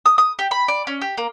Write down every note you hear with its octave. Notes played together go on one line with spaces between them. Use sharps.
D#6
D#6
G4
B5
D5
C#4
G4
A#3